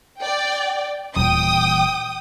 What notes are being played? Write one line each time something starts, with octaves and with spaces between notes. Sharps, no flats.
D5 G5
D#1 E3 G5 D#6